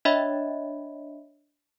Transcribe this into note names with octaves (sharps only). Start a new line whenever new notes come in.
D4 C#5 D#5 E5 B5